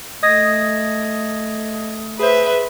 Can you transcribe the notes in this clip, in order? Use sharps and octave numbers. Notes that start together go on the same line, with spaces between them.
A3 D#5 D#6 G#6 A#6
G#4 B4 C5 E5